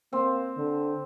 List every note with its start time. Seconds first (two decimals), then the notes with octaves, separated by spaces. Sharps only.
0.13 A#3 C4
0.57 D3